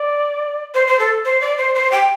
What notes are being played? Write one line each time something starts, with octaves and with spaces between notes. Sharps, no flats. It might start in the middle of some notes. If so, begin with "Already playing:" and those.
Already playing: D5
C5
C5
A4
C5
D5
C5
C5
G5